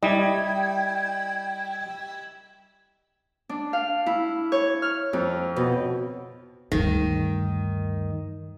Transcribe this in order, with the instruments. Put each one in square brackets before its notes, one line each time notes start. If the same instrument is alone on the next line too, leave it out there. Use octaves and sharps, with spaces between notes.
[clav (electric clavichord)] G3 [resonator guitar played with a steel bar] E4 [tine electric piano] D#5 [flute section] G5 G#6
[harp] D4
F5
E4
C#5
F6
F2
B2
[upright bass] D2 G2 [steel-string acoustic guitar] D#3